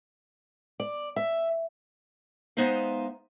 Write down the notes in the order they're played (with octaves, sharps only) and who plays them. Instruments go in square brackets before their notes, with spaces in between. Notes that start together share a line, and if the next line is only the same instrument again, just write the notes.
[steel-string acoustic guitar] D5
E5
G#3 B3 D#4 C5 E5 F5